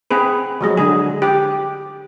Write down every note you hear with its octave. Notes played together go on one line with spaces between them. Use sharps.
C4 G#4 B4
F3 F#3 G#3
D3 G#3 G#4
G4